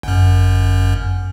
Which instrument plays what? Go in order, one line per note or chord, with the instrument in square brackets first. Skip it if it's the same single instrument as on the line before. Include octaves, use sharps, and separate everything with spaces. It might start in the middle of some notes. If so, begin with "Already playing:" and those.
[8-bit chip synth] G1 F#2